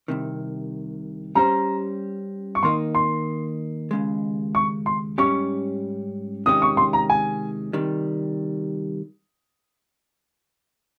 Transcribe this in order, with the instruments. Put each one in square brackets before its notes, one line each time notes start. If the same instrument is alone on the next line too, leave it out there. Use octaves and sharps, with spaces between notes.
[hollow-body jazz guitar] C2 C3 D#3
[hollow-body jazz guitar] G3 C#4 G4 C5 [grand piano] A#5
[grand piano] C#6
[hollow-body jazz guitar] D#2 D#3 A#3 D#4 [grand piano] C6
[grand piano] C6
[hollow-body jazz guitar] D#2 C#3 G#3
[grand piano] C#6
C6
[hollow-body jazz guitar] G#2 G3 C#4 G4 [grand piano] C#6
[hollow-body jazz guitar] C3 D#3 G#3 C#4 G4 [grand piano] D#6
[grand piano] C#6
C6
A#5
G#5
[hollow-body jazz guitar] C3 D#3 G3